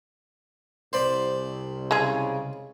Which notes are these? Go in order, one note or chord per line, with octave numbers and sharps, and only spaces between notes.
C2 C5 D5 B5
C#3 G#3 G#4